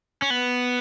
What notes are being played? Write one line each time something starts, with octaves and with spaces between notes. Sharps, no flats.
C#4
B3